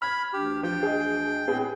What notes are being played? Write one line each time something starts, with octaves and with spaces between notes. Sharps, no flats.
B5 F6 G#6
D2 E3 D4 G4
F3 G5
G#4 D#5
A2 B3 C4 G4 G#4 B4